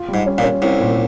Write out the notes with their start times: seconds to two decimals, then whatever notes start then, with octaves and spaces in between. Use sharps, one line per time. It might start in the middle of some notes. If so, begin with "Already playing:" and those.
Already playing: F4
0.08 G3
0.14 G#2
0.26 C#4
0.38 A#1 A#2
0.44 C#4
0.62 C2 C3 C#4
0.80 A#2